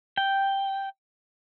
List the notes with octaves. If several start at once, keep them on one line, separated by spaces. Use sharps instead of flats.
G5